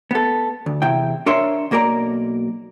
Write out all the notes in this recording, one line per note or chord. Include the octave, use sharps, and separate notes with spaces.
B3 A4
D2
E2 C3 E4 G5
D4 A#4 C#5 E5 C6
B1 A#3 A#4 D5 A#5